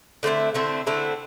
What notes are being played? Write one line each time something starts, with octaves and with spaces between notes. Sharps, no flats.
D3 A3 C4 E4
D3 A3 C4 E4
D3 A3 C4 E4